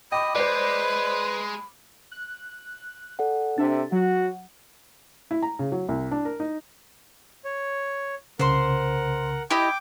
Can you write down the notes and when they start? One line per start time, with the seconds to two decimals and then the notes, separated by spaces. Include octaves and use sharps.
0.12 D#5 G5 B5 D6
0.35 G#3 B4 C5 D5
2.12 F#6
3.19 A4 D5 F#5
3.58 C3 D4 A4 E5 A6
3.92 F#3 F#4 F#5
5.31 E4
5.43 A#5
5.59 C#3
5.72 F#3
5.89 C2
6.11 D4
6.25 A#4
6.40 D#4
7.45 C#5
8.39 C2 C#3 A#4 C5 F#5 C6
9.51 E4 G4 D#5 G5 D6